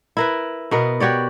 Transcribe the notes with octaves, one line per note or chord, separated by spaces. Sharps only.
E4 A#4 B4
B2 B3 A#4
F#4 G4 C#5 D5